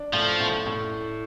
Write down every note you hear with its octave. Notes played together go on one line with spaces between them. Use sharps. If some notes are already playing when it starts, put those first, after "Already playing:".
Already playing: D4
A2 F3
A2
A2